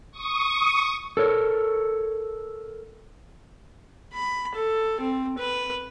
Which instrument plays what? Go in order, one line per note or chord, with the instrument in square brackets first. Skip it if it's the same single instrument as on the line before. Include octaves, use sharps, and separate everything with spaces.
[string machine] C#6 D#6
[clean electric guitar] A4 A#4 C#5
[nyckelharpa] B5
A4
C4
B4